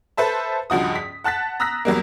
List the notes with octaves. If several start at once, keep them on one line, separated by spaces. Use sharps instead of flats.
A4 B4 C5 E5 A5
C#2 G2 F3 F#4 D#6
B6
F#5 A5 F#6 A6 B6
A#5 D#6 E6 F#6 A#6 B6
E2 F#3 G3 A#3